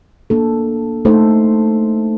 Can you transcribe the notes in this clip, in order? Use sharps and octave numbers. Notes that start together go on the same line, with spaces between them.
A#3 D4 A4
A3 D#4 A4 C5